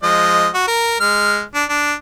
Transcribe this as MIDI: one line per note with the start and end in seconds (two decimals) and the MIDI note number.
0.03 0.49 53
0.03 0.49 56
0.03 0.49 75
0.54 0.67 66
0.68 0.96 70
1.00 1.42 56
1.00 1.42 89
1.54 1.64 62
1.69 1.93 62